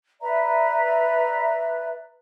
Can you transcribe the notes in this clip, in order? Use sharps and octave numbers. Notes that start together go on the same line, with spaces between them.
B4 D5 E5 A#5